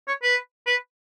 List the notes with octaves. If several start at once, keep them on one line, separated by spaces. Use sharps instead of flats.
C#5
B4
B4